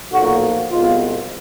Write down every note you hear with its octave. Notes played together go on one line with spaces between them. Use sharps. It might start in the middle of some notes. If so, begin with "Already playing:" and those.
B1 A#2 F3 A#3 F#4
C2 B2 G#3 B3 F4